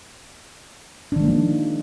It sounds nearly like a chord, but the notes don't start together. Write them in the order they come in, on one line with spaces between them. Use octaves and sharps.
D4 D#3 G#3 A#3 F3